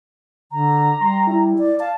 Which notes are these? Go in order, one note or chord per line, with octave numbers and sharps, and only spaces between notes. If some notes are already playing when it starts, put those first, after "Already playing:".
D3 A#5
G3 C6
E4
D5
F5 A5